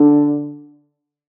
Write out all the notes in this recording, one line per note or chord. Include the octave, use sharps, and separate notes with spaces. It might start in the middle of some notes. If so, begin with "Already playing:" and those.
Already playing: D3 D4